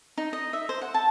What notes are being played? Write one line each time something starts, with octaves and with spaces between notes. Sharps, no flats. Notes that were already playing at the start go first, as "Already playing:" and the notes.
D#4
D#5
E5
C5
F#5
A5